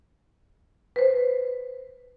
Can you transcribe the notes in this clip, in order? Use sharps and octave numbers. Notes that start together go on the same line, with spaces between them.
B4 C5